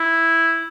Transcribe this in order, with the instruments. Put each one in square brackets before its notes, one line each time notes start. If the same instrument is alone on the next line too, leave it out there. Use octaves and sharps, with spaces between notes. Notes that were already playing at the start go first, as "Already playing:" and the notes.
Already playing: [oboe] E4